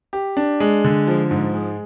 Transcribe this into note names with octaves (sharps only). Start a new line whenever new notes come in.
G4
D4
G#3
D3
F3
G#2
G#3